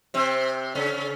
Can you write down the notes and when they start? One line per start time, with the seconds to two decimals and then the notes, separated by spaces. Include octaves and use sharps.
0.14 C3 C4
0.75 C#3 C#4